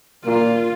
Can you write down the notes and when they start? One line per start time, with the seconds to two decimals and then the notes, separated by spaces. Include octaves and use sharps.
0.25 A#2 F4